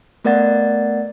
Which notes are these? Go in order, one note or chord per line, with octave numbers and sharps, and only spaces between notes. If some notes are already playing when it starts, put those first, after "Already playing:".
A3 B3 A#4 D5 F#5 A6